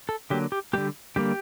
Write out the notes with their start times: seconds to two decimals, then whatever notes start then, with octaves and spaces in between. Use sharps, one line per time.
0.09 A4
0.30 D3 F#3 A#3 G4
0.52 G4
0.73 D3 G3 A#3 G4
1.16 D3 G3 A#3 G4